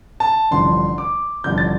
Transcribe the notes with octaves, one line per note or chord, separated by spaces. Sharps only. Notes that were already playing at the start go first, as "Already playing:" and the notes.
A5
A1 G2 D3 F3 C6
D6
A1 G2 D3 F3 G6
A6